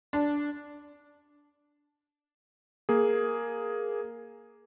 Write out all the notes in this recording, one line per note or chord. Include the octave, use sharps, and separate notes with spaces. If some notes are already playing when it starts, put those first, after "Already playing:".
D4
A#3 G#4